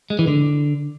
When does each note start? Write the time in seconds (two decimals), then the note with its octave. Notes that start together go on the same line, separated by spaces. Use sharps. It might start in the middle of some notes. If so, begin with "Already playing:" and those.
0.10 G#3
0.19 E3
0.27 D3